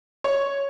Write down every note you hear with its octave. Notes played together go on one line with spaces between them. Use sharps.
C#5